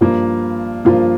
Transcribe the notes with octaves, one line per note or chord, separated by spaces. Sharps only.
G2 F3 A#3 F4
G2 F3 A#3 F4